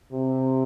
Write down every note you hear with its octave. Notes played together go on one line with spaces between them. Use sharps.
C3